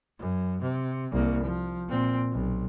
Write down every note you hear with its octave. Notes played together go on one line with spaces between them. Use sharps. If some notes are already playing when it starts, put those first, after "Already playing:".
F#2
C3
C2 A#3
F3
A#2 C4
B1